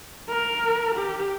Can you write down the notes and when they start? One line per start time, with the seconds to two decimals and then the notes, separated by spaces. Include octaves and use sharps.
0.29 A#4
0.95 G4